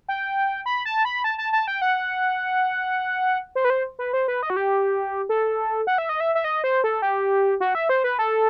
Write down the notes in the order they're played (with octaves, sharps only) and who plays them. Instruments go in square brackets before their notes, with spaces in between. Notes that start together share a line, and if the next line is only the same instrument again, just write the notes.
[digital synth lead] G5
B5
A5
B5
A5
A5
A5
G5
F#5
C5
B4
C5
B4
C5
B4
D#5
F#4
G4
A4
F#5
E5
D#5
E5
E5
D#5
C5
A4
G4
F#4
E5
C5
B4
A4